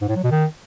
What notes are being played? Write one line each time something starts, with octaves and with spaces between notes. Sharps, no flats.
G#2
A2
F#3
B2
D#3